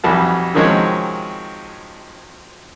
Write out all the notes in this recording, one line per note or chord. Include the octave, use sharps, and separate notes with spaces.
B1 F2 E3 G3 A5
C3 D#3 F3 F#3 G#3 C#4